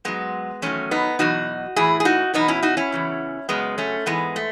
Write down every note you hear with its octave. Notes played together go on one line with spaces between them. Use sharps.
G#2 F#3 G#3 B3
E2 D#3 F#3 A3 C#4
B3 D#4
E2 B2 F#3 D#4 F#4
A2 E3 E4 G#4
G#4
D#4 F#4
E2 B2 F#3 B3 D#4
C#4 E4
D#4 F#4
C#4 E4
E2 C#3 E3
F#2 C#3 F#3 G#3 B3
A3 C#4
G#2 E3 G#3 B3
A3